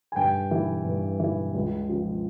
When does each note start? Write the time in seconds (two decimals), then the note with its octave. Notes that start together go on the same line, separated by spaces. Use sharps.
0.12 G#5
0.16 G2 G5
0.51 E3
0.85 G2
1.20 E3
1.54 C#2
1.89 C#3 F3